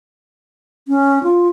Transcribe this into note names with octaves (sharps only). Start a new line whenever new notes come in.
C#4
F4